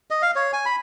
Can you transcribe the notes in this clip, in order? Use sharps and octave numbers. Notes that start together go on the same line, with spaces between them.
D#5
F5
C#5
G#5
B5